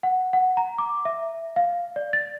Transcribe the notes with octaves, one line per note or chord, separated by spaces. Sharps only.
F#5
F#5
A#5
D6
E5
F5
D5
A6